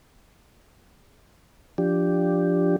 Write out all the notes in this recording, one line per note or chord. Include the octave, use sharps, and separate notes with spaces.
F3 D4 G4